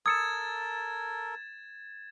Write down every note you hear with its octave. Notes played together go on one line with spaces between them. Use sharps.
A4 A#4 D#6 E6 G#6 A6 C#7 E7